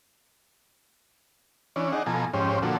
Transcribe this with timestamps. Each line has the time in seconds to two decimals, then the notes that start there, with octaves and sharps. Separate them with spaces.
1.76 E3 C#4 D4
1.92 D4 D#4 G#4 F#5
2.06 B2 F3 A4 G#5 A#5
2.34 F2 G#2 C#4 G4 C5
2.63 A#2 D3 F3 F#4 A4